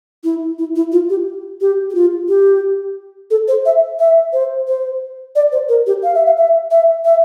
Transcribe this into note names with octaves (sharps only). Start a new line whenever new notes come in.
E4
E4
E4
F4
G4
G4
G4
F4
G4
A4
C5
E5
E5
C5
C5
D5
C5
A#4
G4
F5
E5
F5
E5
E5
E5